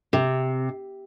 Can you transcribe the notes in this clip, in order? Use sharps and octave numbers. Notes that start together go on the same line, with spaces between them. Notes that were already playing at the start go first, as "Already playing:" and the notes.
C3